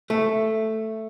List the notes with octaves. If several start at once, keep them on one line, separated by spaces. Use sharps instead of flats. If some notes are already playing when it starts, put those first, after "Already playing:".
A3